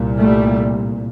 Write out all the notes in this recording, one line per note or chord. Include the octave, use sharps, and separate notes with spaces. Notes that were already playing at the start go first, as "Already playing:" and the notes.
Already playing: C2 A#2
G3 A3